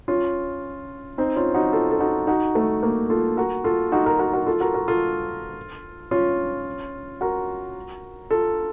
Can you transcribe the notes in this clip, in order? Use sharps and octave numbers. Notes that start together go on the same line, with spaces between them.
C#4 F4
C4 D#4
C#4 F4
D#4 F#4
F4 A4
A4
D#4 F#4
D#4 F#4
A3
A#3
F4 A4
F#4 A#4
F4 A4
D#4 F#4
F#4 A#4
F#4 A#4
F#4 A#4
F4 A4
F#4 A#4
F#4 A#4
F4 A4
C#4 F4
F#4 A#4
F4 A4